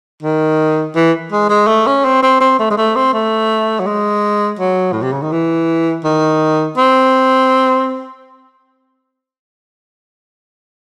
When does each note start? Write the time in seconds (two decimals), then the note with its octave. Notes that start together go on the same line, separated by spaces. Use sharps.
0.23 D#3
0.95 E3
1.32 G#3
1.49 G#3
1.67 A3
1.87 C#4
2.04 C4
2.22 C4
2.41 C4
2.59 A3
2.70 G#3
2.77 A3
2.96 C4
3.13 A3
3.80 F#3
3.86 G#3
4.59 F#3
4.92 A2
5.02 C3
5.12 C#3
5.22 D#3
5.32 E3
6.04 D#3
6.77 C4